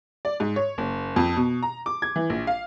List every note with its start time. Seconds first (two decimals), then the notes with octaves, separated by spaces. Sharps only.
0.25 D5
0.40 G#2
0.56 C#5
0.78 F#1
1.16 F2
1.36 B2
1.63 A#5
1.86 D6
2.02 G#6
2.16 E3
2.30 A#1
2.47 F5